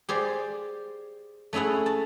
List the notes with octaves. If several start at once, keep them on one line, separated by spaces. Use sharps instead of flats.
G4 G#4 C5 D5
A3 C#4 E4 G#4 F#5
A5